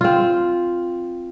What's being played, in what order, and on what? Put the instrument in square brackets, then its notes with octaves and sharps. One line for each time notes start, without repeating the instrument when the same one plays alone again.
[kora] C4 F4